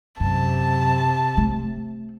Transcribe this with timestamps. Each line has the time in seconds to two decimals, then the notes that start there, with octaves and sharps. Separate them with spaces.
0.20 F#2 C3 A5
1.37 A3